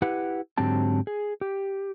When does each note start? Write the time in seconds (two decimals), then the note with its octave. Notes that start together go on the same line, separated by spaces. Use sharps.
0.02 E4 G4 B4 F#5
0.58 G#2 D3 F#3 C4 G4 A5
1.07 G#4
1.41 G4